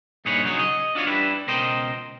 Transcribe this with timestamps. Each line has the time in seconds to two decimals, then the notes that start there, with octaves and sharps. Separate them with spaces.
0.25 G2 A#2 D#4 G#4 B4 C#5
0.44 C#3 F#3 D#4 F#4 G#4 C#5
0.59 D#5
0.95 D4 F4 F#4 C#5
1.07 G3 D4 E4 B4
1.47 C#2 B2 A#4 C5 D#5 G5